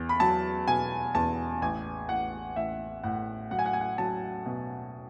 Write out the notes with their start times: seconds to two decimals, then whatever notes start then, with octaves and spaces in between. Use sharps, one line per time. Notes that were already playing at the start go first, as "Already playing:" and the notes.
Already playing: E2
0.09 B5
0.20 F#3 A5
0.67 B2 G#5
1.15 E2 A5
1.62 A1 G#5
2.09 A1 F#5
2.56 A1 E5
3.03 A2 F#5
3.51 F#3 F#5
3.59 G#5
3.66 F#5
3.73 G#5
3.81 F#5
3.98 F#3 A5
4.46 B2